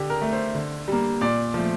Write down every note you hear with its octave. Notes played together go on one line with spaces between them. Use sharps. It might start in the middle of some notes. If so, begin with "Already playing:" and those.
Already playing: D3 G4
A#4
A3
C5
D3
G3 A#3
A#2 D5
F3 A3